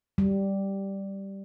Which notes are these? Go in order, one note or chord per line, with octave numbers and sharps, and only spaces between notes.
G3